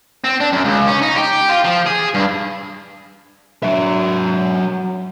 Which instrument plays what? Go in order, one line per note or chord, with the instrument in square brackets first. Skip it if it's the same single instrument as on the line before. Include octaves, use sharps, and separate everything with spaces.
[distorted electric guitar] C4
D4
F#2
C#2
C#4
D#4
G4
F4
F3
G#4
G2
[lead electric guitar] F#3 E5